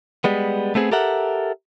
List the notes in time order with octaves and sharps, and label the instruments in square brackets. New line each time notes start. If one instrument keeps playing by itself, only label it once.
[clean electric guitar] G3 G#3 B3
A3 B3 C4 G#4
G4 A4 A#4 E5 F#5